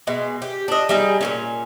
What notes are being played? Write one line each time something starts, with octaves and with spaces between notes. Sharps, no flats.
B2 G#3
G4
D4 D#5
G3 D#4 G#4
A#2 D#3 C#4